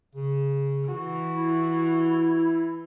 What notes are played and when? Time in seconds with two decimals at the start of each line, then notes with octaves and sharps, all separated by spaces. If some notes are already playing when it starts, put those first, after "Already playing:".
0.15 C#3
0.88 E3 F#4
1.33 E4